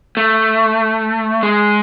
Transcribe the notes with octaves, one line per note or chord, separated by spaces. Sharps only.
A3
G#3